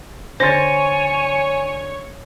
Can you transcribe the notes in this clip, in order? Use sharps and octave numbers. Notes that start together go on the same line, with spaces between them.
D3 C5 C#5 G#5 C6 A6 A#6